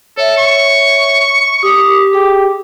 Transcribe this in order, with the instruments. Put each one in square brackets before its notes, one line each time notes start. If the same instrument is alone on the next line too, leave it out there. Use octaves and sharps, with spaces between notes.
[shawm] A4 [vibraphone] C#5 E5
[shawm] C#6
[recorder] G4 [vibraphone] D#6
[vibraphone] G#4 G5